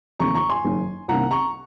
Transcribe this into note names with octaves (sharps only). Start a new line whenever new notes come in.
F1 D#2 D#3 A#5 C#6
A#5 C#6
G#5 C6
F#1 F#2 D#3
C2 C3 D#3 A#3 C#4 F#5 A#5
A#5 C#6